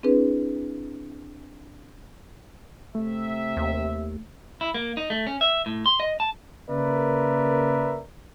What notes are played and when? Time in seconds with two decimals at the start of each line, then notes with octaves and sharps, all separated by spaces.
0.03 C4 D4 E4 G#4 B4
2.95 C3 A3 E5
3.57 D#2
4.61 E4
4.74 A#3
4.97 D#4
5.10 A3
5.27 C#4
5.41 E5
5.66 A2
5.86 C6
6.00 D#5
6.20 A5
6.70 C#3 A#3 A#4 B4 D5 E5